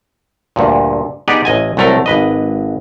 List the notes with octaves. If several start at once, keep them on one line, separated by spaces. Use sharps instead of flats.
D2 G2 A#2
B3 D#4 G4 G#4 B4 D5
A1 D#5 G#5
C2 F#3 A3 A#4 A#5
G#1 B4 D#5